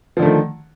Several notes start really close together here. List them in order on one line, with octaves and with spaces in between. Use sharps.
F3 D3 A3 D#3